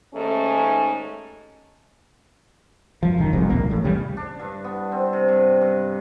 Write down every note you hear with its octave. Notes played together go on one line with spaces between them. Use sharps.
D#2 G#2 A3 C#4
F#2 F3
E1 F#2 D#3
G1 C2 F2 G#2
D1 A#1 F#2 A#3
A1 A2
E2 C#3 G3
D4
G2
B3
C4
C3
G2
G2